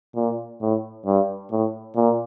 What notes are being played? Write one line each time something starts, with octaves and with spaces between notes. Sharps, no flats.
A#2
A2
G2
A2
A#2